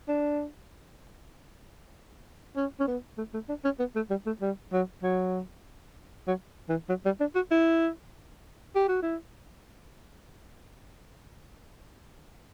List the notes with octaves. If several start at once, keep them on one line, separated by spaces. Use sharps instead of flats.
D4
C#4
C#4
B3
A3
A3
D4
C#4
B3
A3
G3
A3
G3
F#3
F#3
F#3
E3
F#3
G3
D4
F#4
E4
G4
F#4
E4